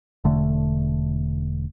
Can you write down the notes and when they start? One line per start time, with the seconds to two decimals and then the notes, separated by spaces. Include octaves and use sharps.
0.24 E1 D3 A3